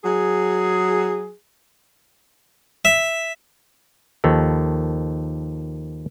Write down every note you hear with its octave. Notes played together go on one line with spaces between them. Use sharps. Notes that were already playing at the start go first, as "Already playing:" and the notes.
F#3 G#4
E5
D#2 D#3 F3 A4